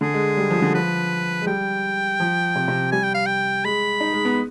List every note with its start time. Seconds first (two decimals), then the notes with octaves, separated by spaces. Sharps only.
0.01 D3 G#4
0.14 G#3
0.37 G3
0.50 F3
0.62 D3
0.75 F3 B4
1.42 G#3
1.46 G3 G5
2.20 F3
2.55 C3
2.68 C3
2.92 G3 G#5
3.03 G5
3.15 F5
3.26 G5
3.65 G#3 B5
4.00 D#4
4.13 G#3
4.25 B3